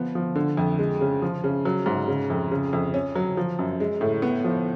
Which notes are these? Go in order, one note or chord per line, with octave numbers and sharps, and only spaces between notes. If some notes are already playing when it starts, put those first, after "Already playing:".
Already playing: F3 B3
F3
D3
F2
G#3
C#3
F3
C#3
F#3
G#2
C#3
F2
C#3
F2
C#4
F#3
F3
F#2
G#3
A2
B3
F3